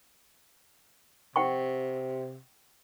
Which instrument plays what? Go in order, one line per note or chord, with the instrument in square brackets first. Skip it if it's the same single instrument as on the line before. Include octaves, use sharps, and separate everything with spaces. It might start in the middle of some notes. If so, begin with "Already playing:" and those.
[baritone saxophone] C3 [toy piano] F#5 G5 C#6